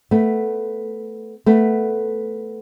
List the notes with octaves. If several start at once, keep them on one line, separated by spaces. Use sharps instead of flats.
A3 B3
A3 B3